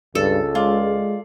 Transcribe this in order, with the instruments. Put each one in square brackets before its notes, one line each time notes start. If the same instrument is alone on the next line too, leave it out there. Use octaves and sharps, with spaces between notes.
[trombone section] C#2 [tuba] G2 [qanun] A4
[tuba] G#3 [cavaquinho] F4 D5